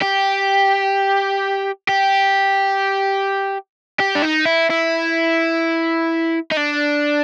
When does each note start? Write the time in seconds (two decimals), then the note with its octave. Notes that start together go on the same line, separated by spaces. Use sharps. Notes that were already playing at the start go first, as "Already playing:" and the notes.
0.02 G4
1.89 G4
4.00 G4
4.15 D4
4.22 D#4
4.46 E4
4.70 E4
6.51 D#4
6.57 D4